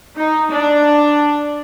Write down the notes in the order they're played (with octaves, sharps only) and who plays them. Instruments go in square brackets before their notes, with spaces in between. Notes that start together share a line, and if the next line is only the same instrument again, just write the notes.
[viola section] D#4
D4